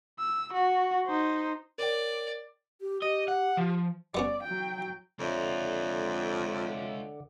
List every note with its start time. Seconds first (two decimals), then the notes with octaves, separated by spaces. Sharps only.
0.19 E6
0.53 F#4
1.06 D#4 C5
1.78 A#4 C#5 D5 G5
2.81 G4
3.02 G4 D#5
3.28 F#5
3.58 F3
4.15 G3 B3 C#4 D5
4.43 F#3 G5
5.20 F2 D3 G#3 F4 C#5 D5 E5